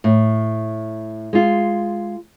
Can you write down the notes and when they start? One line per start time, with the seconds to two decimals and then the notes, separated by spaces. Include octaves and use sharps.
0.04 A2
1.33 G#3 F4